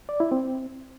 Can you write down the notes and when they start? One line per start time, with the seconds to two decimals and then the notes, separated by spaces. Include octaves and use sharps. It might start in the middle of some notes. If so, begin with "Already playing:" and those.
0.09 D5
0.20 E4
0.31 C4